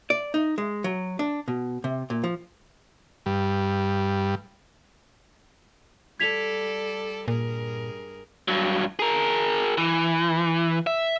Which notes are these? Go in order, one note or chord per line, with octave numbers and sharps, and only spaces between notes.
D5
D#4
G#3
F#3
D4
B2
C3
A#2
F3
G2
G3 A4 D5 G#6 B6 F7
G2 A#2 G#4 A#4
G2 F#3
G#4 A#4
E3
E5